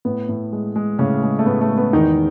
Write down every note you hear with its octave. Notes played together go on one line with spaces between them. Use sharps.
A2 B3
A2
G#3
G#3
A2 C#3 C#4
G#3
A3
A2 B3
A3
G#3
B3
E2 D#3 D#4